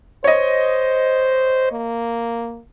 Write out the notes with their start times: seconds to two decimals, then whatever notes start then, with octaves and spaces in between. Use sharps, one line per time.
0.24 C5 C#5 D#5
1.72 A#3